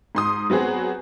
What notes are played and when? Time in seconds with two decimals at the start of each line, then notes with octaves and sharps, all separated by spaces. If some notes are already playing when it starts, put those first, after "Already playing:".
0.15 G#2 C6 D#6
0.50 F#3 B3 C4 F#4 G#4